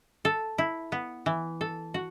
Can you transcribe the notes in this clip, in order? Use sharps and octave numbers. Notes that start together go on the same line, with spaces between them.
A4
E4
B3
E3
A4
F#4